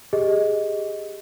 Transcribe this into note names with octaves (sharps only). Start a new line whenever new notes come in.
G4 G#4 D#5